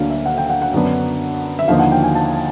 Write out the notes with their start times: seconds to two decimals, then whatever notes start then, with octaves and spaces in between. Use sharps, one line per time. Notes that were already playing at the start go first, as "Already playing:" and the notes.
Already playing: D2 D3 F#3 A#3 D4 F5
0.10 E5
0.26 F#5
0.38 G5
0.50 F#5
0.62 F#5
0.73 F#2 D3 F#3 B3 D4
1.59 E5
1.68 D#2 D3 F3 A#3 D#4 F5
1.79 F#5
1.92 G5
2.03 G#5
2.15 A5